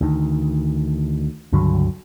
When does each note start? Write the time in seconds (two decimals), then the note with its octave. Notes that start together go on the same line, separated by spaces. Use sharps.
0.01 D2 D#3
1.52 C#2 G2 D3 F#3